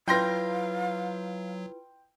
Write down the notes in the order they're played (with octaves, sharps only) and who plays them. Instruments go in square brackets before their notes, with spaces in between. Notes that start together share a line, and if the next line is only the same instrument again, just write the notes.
[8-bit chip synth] F#3 [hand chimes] E4 F4 B4 [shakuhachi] F5 [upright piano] G5 C6 A#6